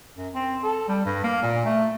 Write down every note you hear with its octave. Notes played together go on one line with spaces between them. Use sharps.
F#2
C4
A4
G3
G2
A#3
A#2
A3